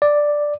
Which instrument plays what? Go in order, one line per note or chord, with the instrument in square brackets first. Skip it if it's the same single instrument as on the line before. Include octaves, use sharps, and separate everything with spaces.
[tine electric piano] D5